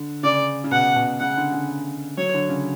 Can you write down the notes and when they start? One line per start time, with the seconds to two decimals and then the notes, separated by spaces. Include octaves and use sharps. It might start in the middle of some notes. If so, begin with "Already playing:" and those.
Already playing: D3
0.23 C#3 D5
0.64 C#3
0.71 B2 F#5
0.96 B2
1.20 C#3 F#5
1.37 D3
1.52 C#3
2.17 F#3 C#5
2.34 D3
2.49 C#3